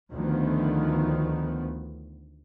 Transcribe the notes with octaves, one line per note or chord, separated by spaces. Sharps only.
D2 D#3 F3 B3